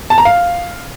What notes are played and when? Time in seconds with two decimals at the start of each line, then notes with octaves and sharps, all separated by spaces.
0.10 A5
0.18 A#5
0.25 F5